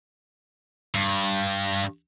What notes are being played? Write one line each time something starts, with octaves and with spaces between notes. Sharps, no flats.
G2